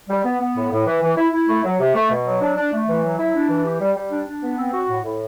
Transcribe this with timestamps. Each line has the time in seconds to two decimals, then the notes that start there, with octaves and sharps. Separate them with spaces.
0.10 G3
0.25 B3
0.41 B3
0.57 A2
0.72 A2
0.87 E3
1.02 E3
1.18 E4
1.33 E4
1.49 A3
1.64 F#3
1.80 C3
1.95 A3
2.11 B2
2.27 F#3
2.41 D4
2.57 D4
2.73 A3
2.89 E3
3.03 F#3
3.19 E4
3.35 D4
3.49 E3
3.65 G4
3.81 G3
3.96 G3
4.12 D4
4.27 D4
4.43 B3
4.58 C4
4.74 F#4
4.89 A2
5.04 A2